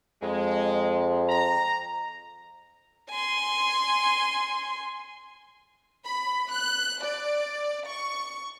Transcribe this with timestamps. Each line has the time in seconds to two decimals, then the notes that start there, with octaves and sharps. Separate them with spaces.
0.22 F2 G#3
1.29 A#5
3.10 G#5 C6
6.04 B5
6.50 F#6
7.02 D5
7.87 C#6